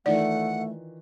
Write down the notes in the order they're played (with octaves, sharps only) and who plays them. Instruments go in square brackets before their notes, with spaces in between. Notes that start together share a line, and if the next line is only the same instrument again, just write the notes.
[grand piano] D#3 E3 F4 [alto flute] A3 [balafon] D5 [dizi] F#5